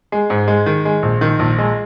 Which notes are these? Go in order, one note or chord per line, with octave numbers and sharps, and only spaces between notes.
G#3
G#2
G#3
D#3
G#3
A#1
D#3
A#1
G#3